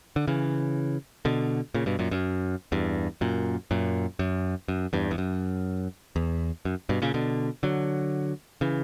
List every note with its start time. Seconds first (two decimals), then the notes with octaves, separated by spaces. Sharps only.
0.16 D3
0.28 C#3 E3
1.25 B2 D3
1.74 A#2 C#3
1.86 G2 B2
1.99 F#2 A#2
2.11 F#2
2.72 E2 G2
3.21 F#2 A#2
3.71 F#2 A#2
4.19 F#2
4.68 F#2
4.93 E2 G2
5.11 E2
5.18 F#2
6.16 E2
6.65 F#2
6.89 G2 B2
7.02 A#2 C#3
7.14 B2 D3
7.63 D3 F#3
8.61 C#3 E3